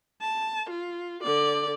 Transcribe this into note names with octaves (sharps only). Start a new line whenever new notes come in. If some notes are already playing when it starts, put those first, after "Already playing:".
A5
F4
D3 D5